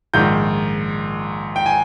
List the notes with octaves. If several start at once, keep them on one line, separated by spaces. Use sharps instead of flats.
A#1 G#2 D#3 G6
G5
G#5